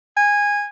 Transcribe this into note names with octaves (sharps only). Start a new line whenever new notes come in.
G#5